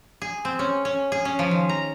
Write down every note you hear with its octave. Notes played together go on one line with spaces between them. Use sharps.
G#4
C4
C#4
C#4
G#4
C#4
F3
D#3
A#5